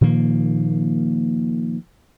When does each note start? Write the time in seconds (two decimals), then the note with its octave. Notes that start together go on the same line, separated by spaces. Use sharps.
0.01 A#2 D#3 F3 A#3